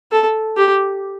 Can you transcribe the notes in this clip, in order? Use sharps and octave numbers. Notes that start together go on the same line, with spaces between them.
A4
G4